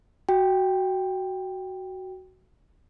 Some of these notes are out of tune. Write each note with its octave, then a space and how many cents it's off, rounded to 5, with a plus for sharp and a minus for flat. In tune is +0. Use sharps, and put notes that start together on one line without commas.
F#4 +10 G5 +10